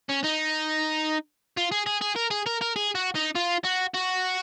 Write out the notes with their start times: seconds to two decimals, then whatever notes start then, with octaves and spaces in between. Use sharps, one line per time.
0.09 C#4
0.24 D#4
1.57 F4
1.72 G#4
1.86 G#4
2.02 G#4
2.16 A#4
2.31 G#4
2.46 A#4
2.61 A#4
2.76 G#4
2.95 F#4
3.15 D#4
3.36 F4
3.64 F#4
3.94 F#4